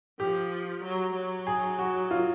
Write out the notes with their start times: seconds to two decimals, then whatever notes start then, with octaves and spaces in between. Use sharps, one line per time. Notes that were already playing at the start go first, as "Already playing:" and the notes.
0.20 F3 G4
0.83 F#3
1.14 F#3
1.47 G#4
1.79 F#4
2.11 F4